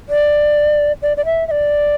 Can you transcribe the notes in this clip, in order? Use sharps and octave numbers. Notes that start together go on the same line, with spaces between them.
D5
D5
D5
E5
E5
D5